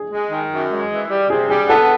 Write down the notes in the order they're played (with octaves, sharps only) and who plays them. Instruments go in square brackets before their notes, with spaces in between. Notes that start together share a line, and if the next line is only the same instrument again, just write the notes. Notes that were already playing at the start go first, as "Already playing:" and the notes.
Already playing: [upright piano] G#4
[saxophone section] G#3
D#3
F#2
G#3
E3
G3
[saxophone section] C3 [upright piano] G#4
[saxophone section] G3 [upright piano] G#4
[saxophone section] B3 [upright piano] A4